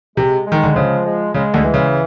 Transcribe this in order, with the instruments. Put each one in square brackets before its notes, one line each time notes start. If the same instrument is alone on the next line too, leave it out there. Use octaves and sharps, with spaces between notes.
[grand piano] C3 [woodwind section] G#3
[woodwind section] G#3
[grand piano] D#3
D3
[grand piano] C#3 [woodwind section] F3
[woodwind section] G#3
[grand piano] C#3 [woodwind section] G#3
[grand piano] D2 D3
[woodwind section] E3
[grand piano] C#3